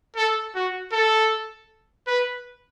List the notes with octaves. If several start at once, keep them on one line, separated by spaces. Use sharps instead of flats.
A4
F#4
A4
B4